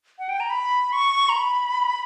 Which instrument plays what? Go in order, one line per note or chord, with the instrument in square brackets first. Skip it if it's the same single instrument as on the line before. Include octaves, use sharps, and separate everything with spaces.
[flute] F#5
G5
A#5
B5
C#6
A#5
B5